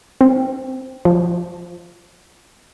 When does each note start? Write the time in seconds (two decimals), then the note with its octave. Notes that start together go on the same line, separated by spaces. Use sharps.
0.21 C4
1.05 F3